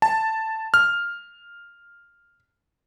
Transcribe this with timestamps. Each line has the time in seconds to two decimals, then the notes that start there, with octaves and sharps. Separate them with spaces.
0.02 A5
0.74 F6